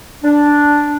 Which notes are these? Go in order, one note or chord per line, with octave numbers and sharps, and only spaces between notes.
D4